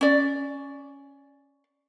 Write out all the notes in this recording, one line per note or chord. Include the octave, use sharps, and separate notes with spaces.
C#4 D5